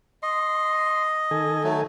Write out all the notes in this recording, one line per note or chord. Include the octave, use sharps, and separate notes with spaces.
D#5 C6
D#3 A4 G#5
F#3 A3